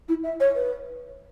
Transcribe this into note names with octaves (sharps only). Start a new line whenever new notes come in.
E4
E5
C#5
B4